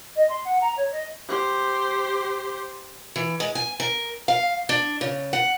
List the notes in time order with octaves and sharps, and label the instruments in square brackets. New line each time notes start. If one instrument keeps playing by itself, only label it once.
[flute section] D#5
C6
F#5
A#5
C#5
D#5
[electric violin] G4 C5
[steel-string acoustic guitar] E3
G#3
G#5
A#4
F5
D4
C#3
F#5